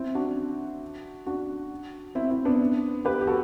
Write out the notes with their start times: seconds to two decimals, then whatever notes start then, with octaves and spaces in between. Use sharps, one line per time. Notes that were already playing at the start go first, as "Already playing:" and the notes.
Already playing: C4 E4
0.15 D4 F#4
1.26 D4 F#4
2.15 C4 E4
2.30 C4 E4
2.45 B3 D4
3.05 G4 B4
3.21 G4
3.27 F#4 A4